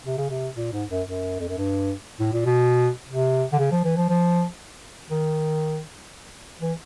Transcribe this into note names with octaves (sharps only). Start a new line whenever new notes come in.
C3
C#3
C3
A#2
G#2
F#2
F#2
F2
F#2
G2
A2
A#2
B2
C3
D3
C#3
F3
E3
F3
F3
D#3
E3